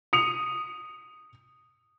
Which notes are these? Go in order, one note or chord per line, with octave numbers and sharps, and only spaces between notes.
D#6 C#7 F7